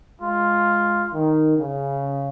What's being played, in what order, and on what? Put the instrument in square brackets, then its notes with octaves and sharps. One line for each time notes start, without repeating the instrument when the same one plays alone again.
[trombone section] G#3 [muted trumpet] F4
[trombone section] D#3
C#3